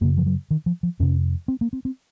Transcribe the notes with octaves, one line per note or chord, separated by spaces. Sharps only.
F#2 C#3 A#3
F3
F#3
D#3
F3
F3
F2 C3 C#4
C4
A#3
C4
C4